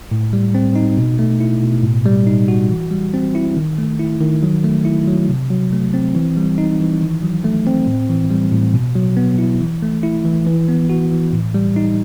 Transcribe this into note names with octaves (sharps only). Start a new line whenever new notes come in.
A2
G3
C4
D#4
B2
A3
E4
B2
A2
G3
D#4
F#4
E3
G3
C4
E4
D#3
A3
E4
D#3
F#3
A3
E4
F#3
C3
F#3
A3
C4
E3
G3
D#4
E3
D#3
F#3
A3
C4
A2
E3
G3
A2
B2
F#3
B3
E4
E3
A3
E4
E3
E3
B3
F#4
E3
A2
G3
D#4